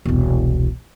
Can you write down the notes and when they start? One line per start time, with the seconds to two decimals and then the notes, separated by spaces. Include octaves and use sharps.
0.05 E1 C2